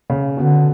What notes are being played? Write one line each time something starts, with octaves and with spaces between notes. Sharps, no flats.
C#3
B2 D3